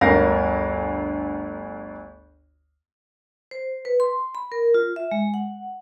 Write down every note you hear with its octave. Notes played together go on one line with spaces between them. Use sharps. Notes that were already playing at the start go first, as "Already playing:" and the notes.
G1 D2 A#4 F5 A#6
C5
B4
C6
B5
A#4
F4
E5
G#3
F#5